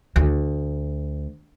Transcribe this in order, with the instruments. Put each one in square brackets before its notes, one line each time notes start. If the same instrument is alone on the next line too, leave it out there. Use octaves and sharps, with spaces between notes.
[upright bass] D2